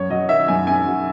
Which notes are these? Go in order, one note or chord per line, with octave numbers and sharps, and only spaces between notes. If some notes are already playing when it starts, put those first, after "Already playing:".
Already playing: F#2 C#5
F#3 D#5
D#3 E5
F#2 G#5
F#2 G#5
F#3